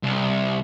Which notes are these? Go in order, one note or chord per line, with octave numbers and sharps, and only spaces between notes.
C2